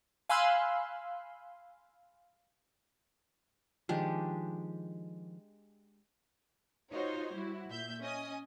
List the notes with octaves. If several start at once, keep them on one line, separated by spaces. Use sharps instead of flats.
F5 G#5 B5 C6 E6 F#6
D#3 F3 G#3 D4 G4
D#4 F4 F#4 C5 C#5
G3 E4 F#4
A#2 E5 G6
C#4 D#5 G#5 D#6